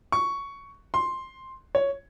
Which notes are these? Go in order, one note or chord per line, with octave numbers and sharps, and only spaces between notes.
C#6
C6
C#5